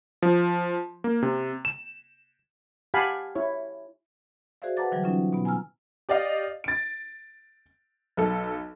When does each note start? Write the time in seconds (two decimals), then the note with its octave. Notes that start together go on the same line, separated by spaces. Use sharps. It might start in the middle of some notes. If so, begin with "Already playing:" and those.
0.22 F3
1.04 A#3
1.22 C3
1.65 E7
2.94 G4 F5 F#5 G#5 A5 B5
3.35 E4 C#5
4.62 F#4 G#4 C5 D5 E5 F5
4.77 B4 F#5 A5 A#5 D6 A6
4.91 D3 E3 F#3 G3
5.04 F#3 C#4 D#4 F4
5.33 B2 B3
5.45 G#5 A#5 E6 F6
6.09 G4 D5 D#5 F5
6.64 A6 D7
8.17 B1 A4